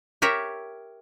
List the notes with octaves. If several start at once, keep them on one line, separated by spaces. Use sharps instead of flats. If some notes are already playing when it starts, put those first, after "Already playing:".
G4 A#4 C#5 E5